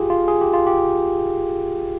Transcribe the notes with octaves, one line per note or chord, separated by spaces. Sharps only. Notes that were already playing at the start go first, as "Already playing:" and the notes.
Already playing: F4 G4 G#4
F4
G#4
G4
F4
G4